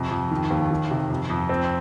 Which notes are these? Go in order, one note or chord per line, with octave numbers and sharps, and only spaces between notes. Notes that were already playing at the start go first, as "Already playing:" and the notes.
Already playing: F2 C3
F2
D#3
D#2
D#3
C3
F2
F2
C4